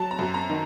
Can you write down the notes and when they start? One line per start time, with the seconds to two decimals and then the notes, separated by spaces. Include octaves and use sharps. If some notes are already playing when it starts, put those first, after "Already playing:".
Already playing: F#3 A5
0.11 A#5
0.19 F#2
0.34 A#5
0.49 D#3